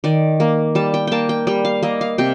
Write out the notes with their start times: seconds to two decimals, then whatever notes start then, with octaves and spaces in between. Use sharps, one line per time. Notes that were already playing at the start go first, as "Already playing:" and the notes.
0.04 D#3 D5
0.40 A#3
0.75 G3 A5
0.94 G5
1.07 A#3 G5 A5
1.29 G5
1.47 G3 G5
1.65 F5
1.83 A#3 D#5
2.01 F5
2.18 C3 G5